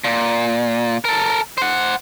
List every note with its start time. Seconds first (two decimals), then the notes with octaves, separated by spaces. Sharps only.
0.04 A#2
1.05 A4 A#4
1.58 C5 F#5